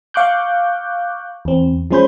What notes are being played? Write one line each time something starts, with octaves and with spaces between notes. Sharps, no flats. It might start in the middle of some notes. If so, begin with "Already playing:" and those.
F5 C#6 D6 F#6 G6
E2 C4
F3 G#3 C#4 C5 B5 G6